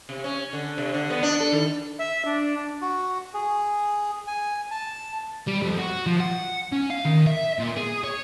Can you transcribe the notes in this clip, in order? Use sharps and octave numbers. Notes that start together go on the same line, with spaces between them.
C3
C#4
D3
C3
D3
B3
D4
A4
D#3
E5
D4
F#4
G#4
G#5
A5
G3
F2
F#4
F3
F#5
C#4
F5
D#3
E5
A#2
G#4
C#5